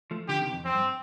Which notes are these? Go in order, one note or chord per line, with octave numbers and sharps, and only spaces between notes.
F3 A3
D3 F3 G4
C3 D#3
F2
F2 C4
G2